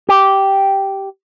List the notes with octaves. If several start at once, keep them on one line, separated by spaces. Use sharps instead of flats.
G4